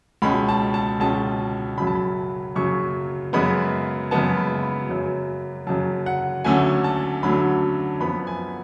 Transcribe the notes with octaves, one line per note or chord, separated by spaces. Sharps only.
C#2 B2 G#3 C#4 B5
A5
A5
C#2 B2 G#3 C#4 A5
F#2 C#3 F#3 B5
A5
B5
F#2 C#3 F#3 C#6
F#2 C#3 G#3 B3 B5
F#2 C#3 G#3 B3 A5
B5
B5
F#2 C#3 F#3
F#2 C#3 F#3 A5
F#5
D2 D3 F#3 A3 C#4 G#5
A5
D2 D3 F#3 A3 C#4 B5
F#2 F3 B3 B5
G#5